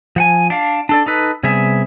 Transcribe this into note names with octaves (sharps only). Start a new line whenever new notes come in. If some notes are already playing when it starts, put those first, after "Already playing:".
F3 F#5 G#5
D4 F5
D4 A4 D5
D#4 A4 B4
C3 G3 B3 G#4 E5